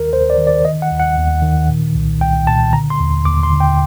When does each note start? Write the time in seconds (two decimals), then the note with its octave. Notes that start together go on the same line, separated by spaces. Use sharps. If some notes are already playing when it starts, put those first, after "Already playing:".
Already playing: D#2 D#3 A#4
0.13 D#2 C5
0.30 D5
0.38 D#3
0.47 D5
0.65 D#3 D#5
0.82 F#5
0.91 D#2
1.00 F#5
1.17 D#2
1.42 D#3
1.69 A#2
1.95 C2
2.20 C2 G5
2.47 A#2 A5
2.73 D3 A#5
2.90 C6
3.00 D#2
3.25 D#2 D6
3.43 C6
3.52 D3
3.60 G5